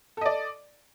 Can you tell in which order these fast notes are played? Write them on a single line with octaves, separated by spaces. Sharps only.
A4 D#5 D5